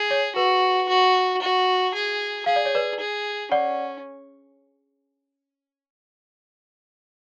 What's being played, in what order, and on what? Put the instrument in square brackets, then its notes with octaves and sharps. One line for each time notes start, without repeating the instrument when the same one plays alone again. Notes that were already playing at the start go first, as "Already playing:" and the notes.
Already playing: [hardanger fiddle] G#4
[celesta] C#5
[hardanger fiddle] F#4 [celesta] B4
[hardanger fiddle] F#4
F#4
G#4
[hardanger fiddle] G#4 [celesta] F5
[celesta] D5
C#5
B4 D5
[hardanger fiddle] G#4
[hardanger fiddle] C#4 [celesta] D5 F#5